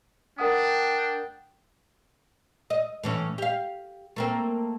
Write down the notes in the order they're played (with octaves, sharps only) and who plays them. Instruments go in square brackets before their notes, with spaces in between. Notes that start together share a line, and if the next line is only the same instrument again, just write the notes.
[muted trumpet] D4 [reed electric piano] A#4 F#5 D#6 [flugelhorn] G5
[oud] D#5
A2 E3 C#4
G4 F5
A3 A#3 C4